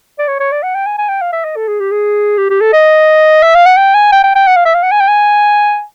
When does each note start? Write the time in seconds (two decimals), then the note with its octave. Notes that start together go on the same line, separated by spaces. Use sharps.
0.19 D5
0.28 C#5
0.40 C#5
0.52 D5
0.63 F#5
0.75 G5
0.86 G#5
0.98 G#5
1.09 G5
1.21 F5
1.33 E5
1.45 D#5
1.56 A4
1.68 G#4
1.80 G4
1.91 G#4
2.37 G4
2.50 G4
2.61 A4
2.73 D#5
3.43 E5
3.55 F5
3.66 F#5
3.77 G5
3.94 G#5
4.12 G5
4.24 G5
4.35 G5
4.47 F#5
4.56 F5
4.65 E5
4.74 F5
4.82 F#5
4.92 G#5
5.00 G5
5.08 G#5